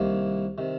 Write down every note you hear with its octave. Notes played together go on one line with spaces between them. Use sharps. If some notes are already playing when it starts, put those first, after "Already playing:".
Already playing: C2 C3 D#3 A#3
C3 D#3